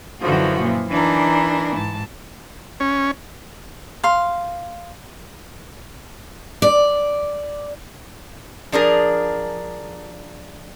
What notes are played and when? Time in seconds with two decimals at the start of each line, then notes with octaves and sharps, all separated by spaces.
0.21 F#2 D3 E3 F3 F#4
0.60 A#2
0.89 E3 D4 D#4 A#4
1.76 G#2 A5
2.80 C#4
4.04 F5 C6
6.62 D5
8.72 F3 D4 G#4 A#4